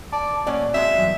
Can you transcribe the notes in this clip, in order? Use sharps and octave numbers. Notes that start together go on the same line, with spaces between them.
D5 A5
A#2 F#3 C#4 D5
G#3 C4 F#4 E5
E2 G2 F#3